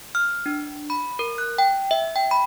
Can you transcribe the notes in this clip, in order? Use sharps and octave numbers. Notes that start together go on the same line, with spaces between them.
F6
D4
B5
A#4
F#6
G5
E5
G5
B5